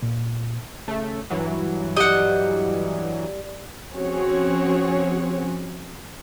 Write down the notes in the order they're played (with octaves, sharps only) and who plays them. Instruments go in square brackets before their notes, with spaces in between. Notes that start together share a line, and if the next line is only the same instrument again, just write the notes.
[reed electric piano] A#2
[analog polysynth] C#3 A3
G2 E3 F#3
[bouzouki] G3 [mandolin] D#5 F#5
[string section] F3 C4 C#4 F#4 G#4 C#5